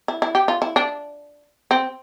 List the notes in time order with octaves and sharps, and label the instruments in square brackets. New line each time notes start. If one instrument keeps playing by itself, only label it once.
[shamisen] E4
E4
G4
F4
E4
D4
C4